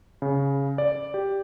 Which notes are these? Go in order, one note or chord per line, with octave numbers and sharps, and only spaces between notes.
C#3
D5
G4